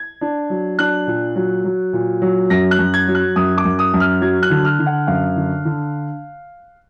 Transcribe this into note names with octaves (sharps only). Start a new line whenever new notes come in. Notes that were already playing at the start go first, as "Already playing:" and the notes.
Already playing: G#6
D4
F#3
D4 F#6
A#2
F#3
F#3
A#2
F#3
F#2 A#6
F#6
F#2
G#6
F#3
F#6
F#2 D#6
D6
F#2
D#6
F#2
F6
F#3 G#6
F#6
D3
F6
D3
F#5
F#2 F5
D3
D3